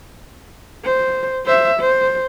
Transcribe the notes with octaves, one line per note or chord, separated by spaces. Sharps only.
C5
C5 E5
C5